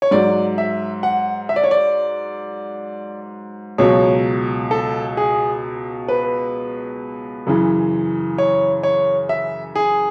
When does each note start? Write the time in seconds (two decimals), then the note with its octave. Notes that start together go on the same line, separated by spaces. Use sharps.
0.02 C#5
0.11 G#2 F#3 D5
0.58 E5
1.03 F#5
1.49 E5
1.56 D5
1.64 C#5
1.71 D5
3.78 C#2 B2 F#3 C#5
4.71 A4
5.17 G#4
6.08 B4
7.47 F#2 C#3 E3
8.38 C#5
8.83 C#5
9.29 E5
9.75 G#4